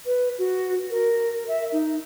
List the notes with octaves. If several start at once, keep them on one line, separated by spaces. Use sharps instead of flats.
B4
F#4
A#4
E5
D#4